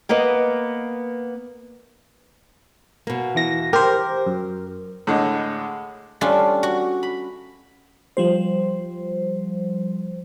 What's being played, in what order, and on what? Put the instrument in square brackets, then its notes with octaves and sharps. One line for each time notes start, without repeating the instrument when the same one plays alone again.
[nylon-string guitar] A#3 B3 B4 D#5
B2 A#3
[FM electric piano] E2 E3 A#6
[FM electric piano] G4 C5 [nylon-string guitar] A#4
[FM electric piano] F#2
[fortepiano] A2 D3 G#3
[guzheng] G3 A3 C#4 D4 F4
F#4
B5
[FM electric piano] F3 G3 C5